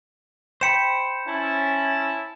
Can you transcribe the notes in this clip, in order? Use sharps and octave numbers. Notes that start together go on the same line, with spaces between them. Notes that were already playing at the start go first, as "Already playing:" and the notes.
C5 G5 B5 C#7 E7
C#4 E4 A5